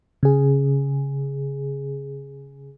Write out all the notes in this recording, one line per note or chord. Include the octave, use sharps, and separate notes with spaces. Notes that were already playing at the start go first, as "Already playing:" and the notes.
C#3 G#4